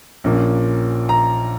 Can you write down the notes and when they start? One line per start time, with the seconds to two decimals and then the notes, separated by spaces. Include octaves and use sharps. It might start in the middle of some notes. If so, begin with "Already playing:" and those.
0.24 A#1 A#2 A#3 C#4
1.09 A#5